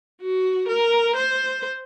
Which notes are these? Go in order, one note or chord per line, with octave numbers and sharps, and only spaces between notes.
F#4
A#4
C5